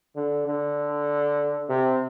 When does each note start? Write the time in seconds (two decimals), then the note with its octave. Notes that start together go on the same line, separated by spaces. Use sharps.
0.16 D3
0.47 D3
1.69 C3